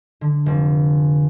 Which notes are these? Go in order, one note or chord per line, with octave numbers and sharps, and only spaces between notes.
D3
F1